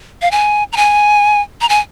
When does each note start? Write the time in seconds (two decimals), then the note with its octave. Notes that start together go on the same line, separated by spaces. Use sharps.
0.22 F5
0.31 G#5
0.73 A#5
0.77 G#5
1.61 A#5
1.69 G#5